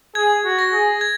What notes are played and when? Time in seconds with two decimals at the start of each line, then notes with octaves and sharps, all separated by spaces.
0.15 G#4 G#6
0.45 F#4
0.59 A#6
0.73 G#4
1.01 G#6